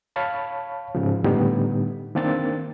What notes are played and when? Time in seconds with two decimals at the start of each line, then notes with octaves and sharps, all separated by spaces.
0.16 C#5 F5 A5 B5 C#6
0.95 G#2 C#3 F3
1.24 A2 D3 G3 B3 D#4 G4
2.15 D#3 A#3 C4 D4 A6